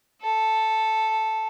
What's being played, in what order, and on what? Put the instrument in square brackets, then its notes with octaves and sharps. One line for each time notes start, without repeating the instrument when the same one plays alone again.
[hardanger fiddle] A4